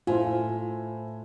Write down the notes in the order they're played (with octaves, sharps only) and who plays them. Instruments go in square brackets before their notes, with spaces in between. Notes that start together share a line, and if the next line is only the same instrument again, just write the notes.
[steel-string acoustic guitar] A2 [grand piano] E4 C5 G#5 [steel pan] F4